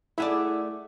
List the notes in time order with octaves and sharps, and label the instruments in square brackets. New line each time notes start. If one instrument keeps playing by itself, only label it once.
[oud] A3 G#4 D5 [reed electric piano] E4 E5 F#5